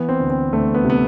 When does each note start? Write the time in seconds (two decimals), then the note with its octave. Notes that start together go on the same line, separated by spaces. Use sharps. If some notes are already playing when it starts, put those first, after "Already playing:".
Already playing: E3 B3
0.09 C4
0.20 D2
0.30 C4
0.53 D2 A3
0.74 B3
0.85 C3 B3